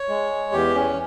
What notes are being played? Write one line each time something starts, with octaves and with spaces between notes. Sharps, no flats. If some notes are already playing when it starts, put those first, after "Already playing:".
Already playing: C#5
G#3
E2 G4
C#4